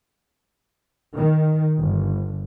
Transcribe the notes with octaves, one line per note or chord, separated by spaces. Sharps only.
D#3
G1